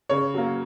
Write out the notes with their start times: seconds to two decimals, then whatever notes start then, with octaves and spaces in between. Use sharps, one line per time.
0.09 C#3 C#5
0.34 F#3 A#3